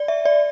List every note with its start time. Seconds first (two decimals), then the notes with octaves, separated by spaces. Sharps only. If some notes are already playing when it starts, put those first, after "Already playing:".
Already playing: D5
0.08 E5
0.25 D5